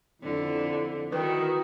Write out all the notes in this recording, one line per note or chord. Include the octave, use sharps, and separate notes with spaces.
F2 D3 E4
D#3 E4 F#4 B4